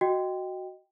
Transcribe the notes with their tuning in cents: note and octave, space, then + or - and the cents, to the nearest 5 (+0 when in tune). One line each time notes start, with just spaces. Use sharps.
F#4 +5 D#5 +0 G5 +0